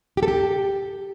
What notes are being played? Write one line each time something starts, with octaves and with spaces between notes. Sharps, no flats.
G4
A4
G4